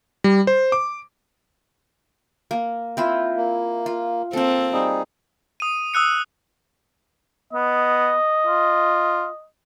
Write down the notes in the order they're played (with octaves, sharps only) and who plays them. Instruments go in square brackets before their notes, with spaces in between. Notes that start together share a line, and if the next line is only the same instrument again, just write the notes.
[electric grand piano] G3
C5
D6
[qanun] A#3
C4 E4 F4
[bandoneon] A#3
[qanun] F4
[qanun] A#3 A4 [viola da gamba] C4
[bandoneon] G3 D#4 G#4
[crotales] D#6 D#7
D#6 E6 F#6 C#7
[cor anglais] B3 [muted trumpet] D#5
[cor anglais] F4